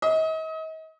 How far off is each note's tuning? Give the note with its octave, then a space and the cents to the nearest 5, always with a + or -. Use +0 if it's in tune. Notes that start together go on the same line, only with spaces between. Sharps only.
D#5 +35